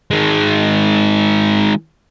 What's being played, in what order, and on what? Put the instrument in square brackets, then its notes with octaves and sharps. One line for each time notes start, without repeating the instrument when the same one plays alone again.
[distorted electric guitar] D#3 G#3